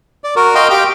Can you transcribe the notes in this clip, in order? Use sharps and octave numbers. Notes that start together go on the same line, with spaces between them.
D5
F#4 A#4
D#5 F5 G5 C6
G4 F5 G5